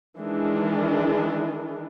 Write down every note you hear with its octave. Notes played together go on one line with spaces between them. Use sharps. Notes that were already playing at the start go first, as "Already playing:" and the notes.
D#3 E3 G#3 D4